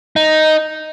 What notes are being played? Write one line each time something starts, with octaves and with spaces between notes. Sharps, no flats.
D#4